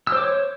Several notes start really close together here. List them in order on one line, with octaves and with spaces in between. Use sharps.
E6 C5 D6 C#5